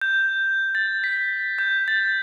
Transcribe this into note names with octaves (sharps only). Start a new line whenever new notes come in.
G6
A6
B6
G6
A6